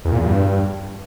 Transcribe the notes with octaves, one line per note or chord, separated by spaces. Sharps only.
E2
A#2
E2
G2